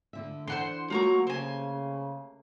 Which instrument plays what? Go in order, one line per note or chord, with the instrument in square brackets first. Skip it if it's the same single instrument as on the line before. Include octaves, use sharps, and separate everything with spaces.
[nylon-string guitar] D2 D3 E5
[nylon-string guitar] E3 D4 A4 [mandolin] C5 F#5 C6
[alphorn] F#3 [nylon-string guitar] A3 A#3 G4 [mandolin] F4 A#5 C#6
[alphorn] C#3 [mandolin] C5 G#5